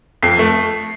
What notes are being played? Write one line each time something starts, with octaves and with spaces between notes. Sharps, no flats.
F2 C7
A3